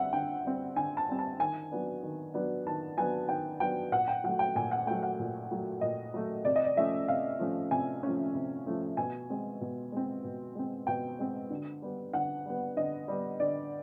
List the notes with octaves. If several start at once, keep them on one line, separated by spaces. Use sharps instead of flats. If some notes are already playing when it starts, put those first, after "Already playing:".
Already playing: D3 G3 C4 E5 F#5
D3 G5
G3 C4
D3 G#5
A5
G3 C4
A5
D#3 G#5
F#3 B3 D4
D#3
F#3 B3 D4
D#3 A5
F#3 B3 D4 G#5
D#3 G5
F#3 B3 D4 G5
A#2 F#5
G5
F#3 A3 F#5
G5
A#2 G#5
F#5
F#3 A3 G5
F#5
A#2
F#3 A3
A#2 D#5
F#3 A3
C3 D5
D#5
D5
F3 A3 C#4 E5
C3 F5
F3 A3 C#4
C3 G#5
F3 A3 C#4
C3
F3 A3 C#4
B2 G#5
G#3 C4
B2
G#3 C4
B2
G#3 C4
B2 G5
G#3 C4
D3
G3 B3
D3 F#5
G3 B3
D3 D#5
G3 B3
D3 D5